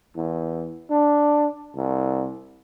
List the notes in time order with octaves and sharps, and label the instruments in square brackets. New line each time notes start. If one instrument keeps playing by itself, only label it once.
[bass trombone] E2
D4
C2